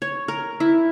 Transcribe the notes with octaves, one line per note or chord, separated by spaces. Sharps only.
C#5
A#4
E4